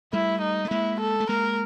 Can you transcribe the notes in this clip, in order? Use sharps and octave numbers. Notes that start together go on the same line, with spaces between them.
G3 A3 E4
D#4
A3
G#3 A#3 E4
A4
A3
G#3 A#3 A#4